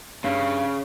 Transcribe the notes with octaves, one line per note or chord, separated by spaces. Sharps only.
G2 C#3